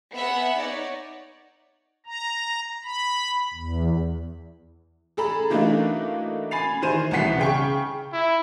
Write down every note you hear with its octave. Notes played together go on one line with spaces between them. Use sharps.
B3 G#4 E5 F#5
D#4 C#5 D5
A#5
B5
E2
G#4 A4 A#5 B5
E3 A3 A#3 D4 D#4 F#4
G#5 B5 A6 C7 F7
D#3 E3 C5 G#5 D#7 E7
C2 B2 E3 F#5 B6 C7
C#3 G5 C#6
E4